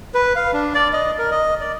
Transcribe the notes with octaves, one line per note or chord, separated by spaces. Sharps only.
B4
F5
D4
D5
D#5
A#4
D#5
D5